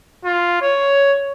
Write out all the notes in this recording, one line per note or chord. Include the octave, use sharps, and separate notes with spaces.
F4
C#5